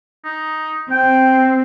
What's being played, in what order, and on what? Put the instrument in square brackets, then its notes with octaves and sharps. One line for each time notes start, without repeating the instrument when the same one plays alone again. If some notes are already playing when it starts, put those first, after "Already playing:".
[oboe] D#4
[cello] C4 [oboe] G5